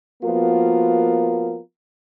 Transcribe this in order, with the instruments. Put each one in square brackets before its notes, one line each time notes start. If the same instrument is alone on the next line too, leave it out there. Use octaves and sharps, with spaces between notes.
[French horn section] F3 A#3 B3 F4 F#4 A#4